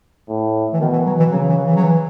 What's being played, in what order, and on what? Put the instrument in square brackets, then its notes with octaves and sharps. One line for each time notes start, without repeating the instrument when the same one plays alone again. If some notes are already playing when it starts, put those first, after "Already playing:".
[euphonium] A2
[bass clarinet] E3
[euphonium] B2 [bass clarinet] D#3
[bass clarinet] E3
F#3
E3
[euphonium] C#3 [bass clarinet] F#3
[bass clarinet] E3
E3
F#3
E3